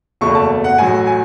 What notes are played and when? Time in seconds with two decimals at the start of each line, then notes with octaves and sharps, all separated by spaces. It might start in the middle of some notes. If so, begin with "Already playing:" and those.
0.21 F#1 E2 B2 A3 C#6
0.35 A5
0.64 F#5
0.78 A1 A2 F#3 G#5
1.07 G#5